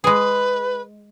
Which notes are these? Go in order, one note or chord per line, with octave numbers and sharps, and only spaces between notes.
G#3 G#4 B4